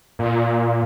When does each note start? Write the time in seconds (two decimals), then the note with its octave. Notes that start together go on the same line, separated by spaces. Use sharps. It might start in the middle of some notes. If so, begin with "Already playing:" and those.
0.19 A#2